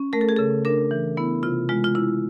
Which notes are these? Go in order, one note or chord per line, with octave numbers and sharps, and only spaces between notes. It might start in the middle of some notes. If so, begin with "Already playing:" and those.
Already playing: C#4
A3 A#4
A4
G#4
C#3 A4
D4 A#4
E3
B3 E4
C3 F4
G#3 F4
F4
E4